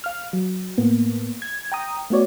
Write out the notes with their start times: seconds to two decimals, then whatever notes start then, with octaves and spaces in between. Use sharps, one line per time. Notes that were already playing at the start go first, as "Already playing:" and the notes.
0.04 F5 F6
0.33 F#3
0.78 A2 A#3 B3
1.42 G#6
1.72 G5 A#5 D#6
2.10 A3 B3 F#4 C#5 D5